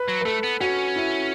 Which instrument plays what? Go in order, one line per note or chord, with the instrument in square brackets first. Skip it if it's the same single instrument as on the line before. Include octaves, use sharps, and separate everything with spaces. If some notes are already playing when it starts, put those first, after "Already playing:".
Already playing: [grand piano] B4
[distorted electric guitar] F#3
[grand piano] B4
[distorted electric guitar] A3 [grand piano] A4
[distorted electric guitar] B3
[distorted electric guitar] C#4 [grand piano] F#4
[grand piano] E4